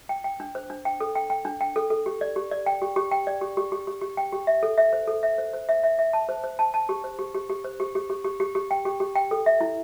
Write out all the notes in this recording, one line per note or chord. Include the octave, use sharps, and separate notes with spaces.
G5
G5
D4
C5
D4
G5
A4
G5
G5
D4
G5
A4
A4
G4
D5
G4
D5
G5
G4
G4
G5
D5
G4
G4
G4
G4
G4
G5
G4
E5
A4
E5
C5
A4
E5
C5
C5
E5
E5
E5
A5
C5
C5
A5
A5
G4
C5
G4
G4
G4
C5
G4
G4
G4
G4
G4
G4
G5
G4
G4
G5
A4
E5
E4